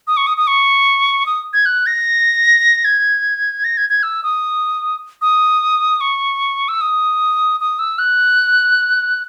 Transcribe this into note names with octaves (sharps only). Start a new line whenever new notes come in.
D#6
C#6
D#6
D#6
C#6
D#6
G#6
F#6
A#6
G#6
A#6
G#6
G#6
E6
D#6
D#6
C#6
E6
D#6
D#6
E6
F#6